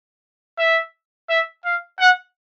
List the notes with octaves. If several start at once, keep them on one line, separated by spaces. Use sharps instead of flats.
E5
E5
F5
F#5